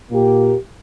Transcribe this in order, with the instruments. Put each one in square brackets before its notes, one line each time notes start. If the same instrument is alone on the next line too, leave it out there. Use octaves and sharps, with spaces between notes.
[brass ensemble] A#2 A#3 G4